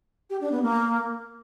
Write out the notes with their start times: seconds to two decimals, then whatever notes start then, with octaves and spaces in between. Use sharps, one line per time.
0.30 G4
0.41 D4
0.52 B3
0.62 A#3